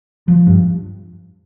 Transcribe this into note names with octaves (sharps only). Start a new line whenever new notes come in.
F3
G2